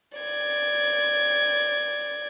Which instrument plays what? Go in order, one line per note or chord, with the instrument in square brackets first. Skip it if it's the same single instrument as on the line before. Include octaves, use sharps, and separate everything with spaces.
[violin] D5 G#6